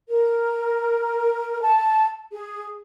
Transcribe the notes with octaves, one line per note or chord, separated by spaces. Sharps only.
A#4
A5
G#4